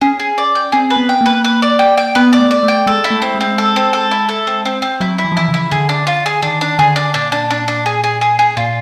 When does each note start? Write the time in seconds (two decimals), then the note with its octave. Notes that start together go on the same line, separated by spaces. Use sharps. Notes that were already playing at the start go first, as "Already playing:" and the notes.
0.01 C#4 G#4
0.20 G#4
0.38 D5
0.55 G5
0.72 C4 G#4
0.90 B4
0.96 B3
1.09 G5
1.21 A#3 B4
1.44 B4
1.62 D5
1.79 G5
1.97 G5
2.15 B3 B4
2.33 D5
2.39 A3
2.51 D5
2.63 A3
2.68 G5
2.87 G#3 A4
3.04 E4
3.11 A3
3.22 C4
3.35 G#3
3.41 C4
3.58 A4
3.76 C4
3.93 A4
4.11 E4
4.29 A4
4.47 C4
4.65 C4
4.82 C4
5.00 F#3 E4
5.18 E4
5.24 E3
5.32 F3
5.37 E3 E4
5.48 C#3
5.54 E4
5.71 D3 G#4
5.89 D4
6.07 F4
6.26 G#4
6.42 D#3 D4
6.61 D4
6.79 D3 G#4
6.96 D4
7.14 A#2 D4
7.32 D4
7.50 D4
7.68 D4
7.86 G#4
8.04 G#4
8.21 G#4
8.39 G#4
8.57 A#2 F4